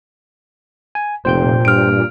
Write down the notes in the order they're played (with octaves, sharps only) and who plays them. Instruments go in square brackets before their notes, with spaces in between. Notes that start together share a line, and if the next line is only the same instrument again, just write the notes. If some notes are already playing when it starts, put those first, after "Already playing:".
[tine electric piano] G#5
[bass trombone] F1 [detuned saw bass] A#2 [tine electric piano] C5 G5 G6
[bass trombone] G2 [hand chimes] F6 D7